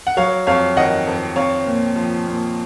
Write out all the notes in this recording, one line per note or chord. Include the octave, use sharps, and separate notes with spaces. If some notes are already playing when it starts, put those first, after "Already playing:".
F#5
F#3 C#5 F5
F2 C#5 F5
D#3 D#5 F#5
F2
C4 C#5 F5
A#2
F3
A#2